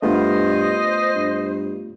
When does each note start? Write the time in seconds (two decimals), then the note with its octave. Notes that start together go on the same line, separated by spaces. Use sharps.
0.02 G2 A3 B3 F4 C5 D#5
1.15 G2